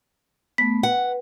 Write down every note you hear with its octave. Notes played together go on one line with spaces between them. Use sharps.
A3 B3 B6
B4 F#5